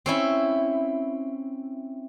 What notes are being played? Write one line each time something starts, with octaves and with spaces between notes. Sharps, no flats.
C4 C#4 E4